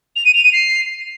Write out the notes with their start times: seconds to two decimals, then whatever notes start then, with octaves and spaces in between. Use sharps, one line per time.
0.16 F7
0.25 D#7
0.34 F7
0.43 D#7
0.52 C7